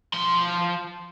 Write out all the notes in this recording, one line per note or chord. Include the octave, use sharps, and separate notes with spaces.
F3 C6